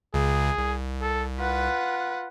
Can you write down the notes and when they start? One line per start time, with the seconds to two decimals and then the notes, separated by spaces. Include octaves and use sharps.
0.14 C#2 C#3 G#4
0.58 C2
1.01 A4
1.39 F4 B4 F#5